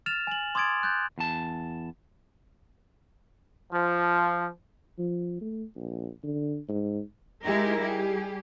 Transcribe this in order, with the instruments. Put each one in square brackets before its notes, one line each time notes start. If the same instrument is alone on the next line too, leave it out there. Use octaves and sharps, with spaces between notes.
[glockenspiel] F6 A6 E7 F7
G#5 F#7
C6 D6 D#6 G#6 A6 D7
F#6 G6 A6
[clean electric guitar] E2 A5
[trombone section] F3
[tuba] F3
A3
A#1
D3
G#2
[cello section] G#3 D#4 E4 G4 G#4 A#4
G3 G4 G#4